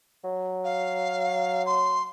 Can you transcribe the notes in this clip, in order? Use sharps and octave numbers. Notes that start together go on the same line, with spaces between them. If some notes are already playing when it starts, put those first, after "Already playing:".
F#3
F5
C6